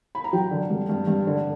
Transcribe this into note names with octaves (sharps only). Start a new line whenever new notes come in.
B5
A#5
F#3 G5
D3
G2
G2
G2
D3